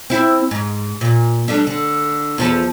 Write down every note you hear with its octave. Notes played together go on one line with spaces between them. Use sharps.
C4 E4
G#2
A#2
G3 A3 D4
D3
E2 F3 A4